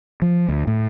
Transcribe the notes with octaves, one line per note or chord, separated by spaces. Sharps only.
F3
D2
A2